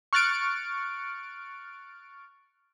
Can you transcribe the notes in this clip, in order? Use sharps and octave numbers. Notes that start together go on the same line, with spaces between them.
C#6 F6 F#6 A6 C#7 D7